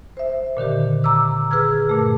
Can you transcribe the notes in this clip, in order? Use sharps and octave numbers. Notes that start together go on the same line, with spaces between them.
C5 E5
A#2 D3 D#3 G4
A#5 D6 E6
G#4 B4 E6 F6 G#6
G2 A#2 A3